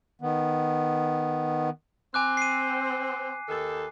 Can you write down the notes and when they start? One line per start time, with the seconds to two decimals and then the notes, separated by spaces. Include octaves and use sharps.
0.21 D#3 B3
2.14 C4 G#5 D6 F#6
2.37 C7 D#7
3.49 D#2 D#3 A4